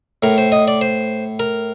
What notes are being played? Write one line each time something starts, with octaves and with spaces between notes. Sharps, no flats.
A2 A#4
C5
D#5
D5
C5
A#4